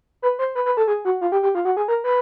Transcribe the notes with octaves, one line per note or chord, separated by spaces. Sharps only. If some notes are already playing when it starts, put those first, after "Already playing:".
B4
C5
B4
B4
A4
G#4
F#4
F4
G4
G4
F4
F#4
G#4
A#4
B4